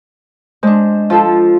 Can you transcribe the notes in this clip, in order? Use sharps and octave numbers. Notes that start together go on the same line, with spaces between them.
G#3 D4 C5
F3 F4 A4